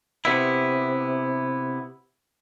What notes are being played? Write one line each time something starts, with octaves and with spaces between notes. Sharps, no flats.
C3 B3 E4